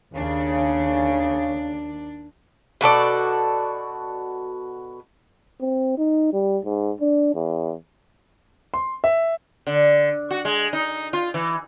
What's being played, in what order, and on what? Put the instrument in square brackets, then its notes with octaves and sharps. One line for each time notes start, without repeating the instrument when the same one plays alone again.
[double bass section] D#2 [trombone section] C#3 [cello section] D4
[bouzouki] B2 F#4 A4 D5
[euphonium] C4
D#4
G3
G#2
D4
E2
[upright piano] C6
E5
[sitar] D3
F#4
G#3
D#4
F4
E3